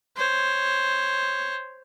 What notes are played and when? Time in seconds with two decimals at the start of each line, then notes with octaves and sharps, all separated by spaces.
0.16 C5 C#5